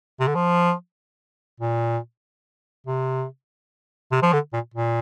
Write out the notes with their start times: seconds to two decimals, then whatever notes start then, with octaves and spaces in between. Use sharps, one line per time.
0.20 C3
0.27 D3
0.35 F3
1.60 A#2
2.87 C3
4.12 C3
4.22 F3
4.33 D3
4.53 A#2
4.74 A#2